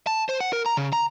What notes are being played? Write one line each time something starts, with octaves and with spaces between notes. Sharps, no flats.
A5
C5
F#5
A#4
A#5
C#3
A#5